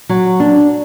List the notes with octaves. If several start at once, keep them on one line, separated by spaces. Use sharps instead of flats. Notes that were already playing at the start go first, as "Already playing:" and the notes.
F#3
D4